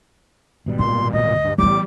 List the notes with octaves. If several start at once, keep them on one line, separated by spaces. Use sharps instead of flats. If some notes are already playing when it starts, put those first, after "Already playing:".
G#1 B2 G3
A#2 D#3 C6
A#2
D2 D#5
G2
A2 E3 G3 B3 D6